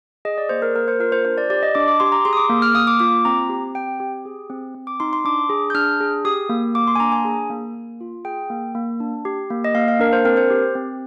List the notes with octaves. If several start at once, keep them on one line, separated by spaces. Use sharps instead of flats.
G#4 D#5
D5
A#3 C5
A#4
A#3 A#4
C5
F4 A#4
C5
D4 C5
D5
G4 D5
D#5
D4 D6
D6
G4 C6
A#5
G#4 C6
D#6
D6
A#3
F6
A#3 D#6
D6
F4 D6
C4 A#5
G4
C4 G5
G4
G#4
C4
C4
D6
D#4 C6
C6
D4 D6
G#4
G6
D4 F6
G#4
G4 D#6
A#3
A#3 D6
C6
G#5
D4 A#5
G#5
G#4
A#3
A#3
F4
G#4 G5
A#3
A#3
D4
G4
A#3
D#5
A#3 F5
F5
D4 A#4
C5
C4 A#4
C5
G4
C4